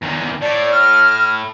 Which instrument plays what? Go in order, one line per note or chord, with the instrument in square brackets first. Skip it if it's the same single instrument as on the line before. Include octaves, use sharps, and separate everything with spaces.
[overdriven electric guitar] E2 D#3
[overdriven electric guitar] A2 [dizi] D5
[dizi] F6